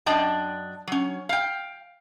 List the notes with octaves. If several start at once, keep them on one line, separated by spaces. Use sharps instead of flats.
F#2 D4 D5 D#5 G5 A5
F#3 C#4
F5 G5